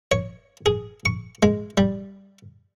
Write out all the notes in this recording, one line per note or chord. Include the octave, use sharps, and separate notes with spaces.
C#5
G#4
C#6
G#3
G3